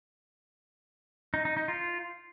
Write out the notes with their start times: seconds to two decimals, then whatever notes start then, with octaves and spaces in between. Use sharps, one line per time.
1.34 D#4
1.45 D#4
1.57 D#4
1.68 F4